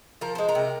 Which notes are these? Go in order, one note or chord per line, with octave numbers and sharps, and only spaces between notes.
F3 A#4
G#3 C5
A#4
C3